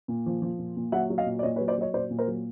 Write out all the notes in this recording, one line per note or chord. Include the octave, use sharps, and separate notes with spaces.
A#2
F3
F3
A#2
A#2
F#3 E5 F#5
F#3
D#5 F5
A#2
D5
A#2 C#5 D#5
B4 C#5
F#3
C5 D5
F#3 C#5 D#5
A#2 C5 D5
A#2
A#4 C5
F#3